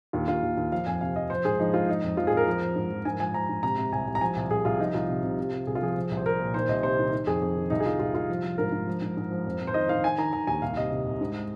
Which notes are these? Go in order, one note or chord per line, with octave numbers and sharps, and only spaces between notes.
D#2 F4
D#2 F4
D#2
D#2
F3 F5
F2 G#5
C3 F5
F3 D#5
F3 C5
G#2 G#4
F3 D#4
G#2 F4
F3 D#4
F2
F3 F4
G#4
F2 A#4
F3
F3
G#2
F3
G#2 G#5
F3 G#5
F3 A#5
G#2
C3 A#5
C3
C2 G#5
C2
A#5
F3 G#5
C2
C2 G#4
C2 F4
F3 D#4
C2 F4
C3
C3
C3
C3
C2 G#4
F4
F3 G#4
F3
C2
C5
C2 A#4
A#2
D#3 C5
C2 D#5
C3 C5
D#3
D#3
F2 G#4
F2
D#3
C2 D#4
G#4
C2 F4
C2 F4
C2 F4
F3
F3
G#2 A#4
G#2
F3
G#2
G#2
F3
F2
F2
C5
D#3 D#5
D#3 F5
D#3 G#5
D#3 A#5
D#3 A#5
D#2 G#5
C2 F5
C3 D#5
C3
C2
G#2